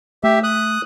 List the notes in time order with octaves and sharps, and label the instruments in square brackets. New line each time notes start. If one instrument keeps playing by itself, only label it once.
[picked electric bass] A3 [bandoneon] G4 E5
[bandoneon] D#6 F#6